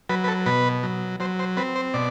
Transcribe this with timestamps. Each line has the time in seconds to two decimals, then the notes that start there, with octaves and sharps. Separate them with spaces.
0.09 F#3 B4
0.24 B4
0.28 A4
0.46 B2 B4
0.83 F#3
1.20 F#3 C5
1.39 C5
1.57 C4 B4
1.76 C5
1.94 B2 D5